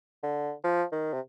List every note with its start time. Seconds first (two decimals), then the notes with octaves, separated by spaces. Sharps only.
0.23 D3
0.64 F3
0.92 D#3
1.13 C3